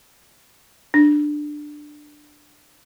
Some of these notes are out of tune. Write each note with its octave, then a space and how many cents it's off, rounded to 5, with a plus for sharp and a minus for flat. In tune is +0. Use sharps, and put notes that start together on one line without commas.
D4 +15